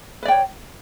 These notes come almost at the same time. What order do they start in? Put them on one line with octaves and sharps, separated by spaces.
B4 D5 G5 C#5